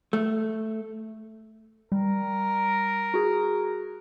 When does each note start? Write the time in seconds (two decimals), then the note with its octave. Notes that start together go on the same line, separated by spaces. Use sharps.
0.13 A3
1.92 G3 A#4
3.14 F#4 G#4